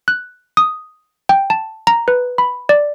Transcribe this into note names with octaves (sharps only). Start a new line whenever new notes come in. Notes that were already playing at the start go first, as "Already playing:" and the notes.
F#6
D#6
G5
A5
A#5
B4
B5
D5